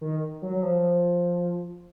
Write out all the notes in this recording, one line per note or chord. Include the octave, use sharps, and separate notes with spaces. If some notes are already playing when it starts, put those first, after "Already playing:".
D#3
F#3
F#3
F3